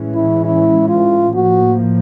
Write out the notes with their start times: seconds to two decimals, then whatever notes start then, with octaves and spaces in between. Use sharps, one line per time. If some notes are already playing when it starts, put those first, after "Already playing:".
Already playing: A2 E3 G#3 C#4
0.15 E4
0.45 E4
0.89 F4
1.34 A2 F3 A#3 F#4